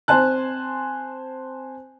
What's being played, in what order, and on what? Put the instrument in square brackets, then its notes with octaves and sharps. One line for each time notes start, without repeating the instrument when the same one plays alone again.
[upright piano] C4 C5 G#5 A5 F#6